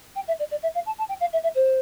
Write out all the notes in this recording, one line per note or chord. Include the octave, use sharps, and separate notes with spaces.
G5
E5
D5
D5
E5
F5
A5
A5
G5
F5
E5
E5
C5